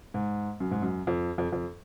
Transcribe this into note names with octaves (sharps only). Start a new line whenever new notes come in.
G#2
F#2
G#2
F#2
F2
F2
F2